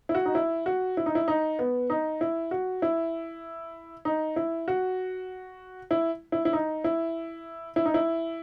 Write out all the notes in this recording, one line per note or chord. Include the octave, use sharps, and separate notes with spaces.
E4
F#4
D#4
E4
F#4
E4
D#4
E4
D#4
B3
D#4
E4
F#4
E4
D#4
E4
F#4
E4
E4
E4
D#4
E4
E4
D#4
E4